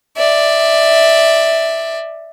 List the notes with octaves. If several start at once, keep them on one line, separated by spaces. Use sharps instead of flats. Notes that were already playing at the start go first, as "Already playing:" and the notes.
D5 E5